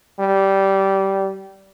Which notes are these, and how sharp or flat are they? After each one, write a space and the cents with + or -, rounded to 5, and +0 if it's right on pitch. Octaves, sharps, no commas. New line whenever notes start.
G3 -15